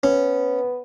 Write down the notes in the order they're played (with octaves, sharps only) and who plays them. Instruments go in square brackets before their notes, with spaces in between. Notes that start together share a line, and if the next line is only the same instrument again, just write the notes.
[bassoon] B3 [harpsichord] C#4